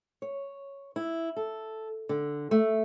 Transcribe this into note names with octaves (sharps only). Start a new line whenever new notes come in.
C#5
E4
A4
D3
A3